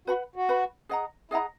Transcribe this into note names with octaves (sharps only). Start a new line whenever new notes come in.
F#4 B4 F#5 B5
F#4
B4 F#5 B5
G#4 D#5 F#5 A#5
E4 G#4 D#5 F#5 A#5